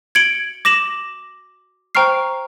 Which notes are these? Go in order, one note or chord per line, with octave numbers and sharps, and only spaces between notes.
G#6 C#7 D7 F#7 G7
D6 A#6 E7 F#7
C5 G5 A#5 C#6 F6 C7